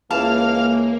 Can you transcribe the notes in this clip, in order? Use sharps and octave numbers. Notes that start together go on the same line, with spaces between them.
C#2 E3 A#3 F5 A5